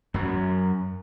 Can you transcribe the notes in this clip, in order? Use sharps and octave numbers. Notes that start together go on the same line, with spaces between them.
F#2 F#3